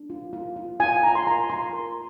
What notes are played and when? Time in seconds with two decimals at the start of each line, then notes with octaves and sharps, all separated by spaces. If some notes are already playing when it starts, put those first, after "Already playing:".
Already playing: D4
0.10 F4
0.33 F4
0.56 F4
0.80 F4 G#5
1.03 F4 A#5
1.15 C6
1.26 A#4 A#5
1.50 F4 C6
1.73 A#4